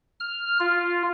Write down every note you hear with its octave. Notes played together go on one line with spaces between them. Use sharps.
F6
F4